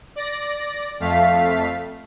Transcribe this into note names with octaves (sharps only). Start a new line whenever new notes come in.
D5 A#6
F2 A3 F5 B6